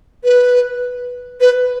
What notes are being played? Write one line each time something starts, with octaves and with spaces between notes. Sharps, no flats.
B4
B4